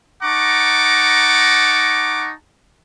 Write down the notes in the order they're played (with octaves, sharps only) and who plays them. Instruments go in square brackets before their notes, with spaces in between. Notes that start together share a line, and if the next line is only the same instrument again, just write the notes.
[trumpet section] D#4 F#5 A5 A#5 C#6 D6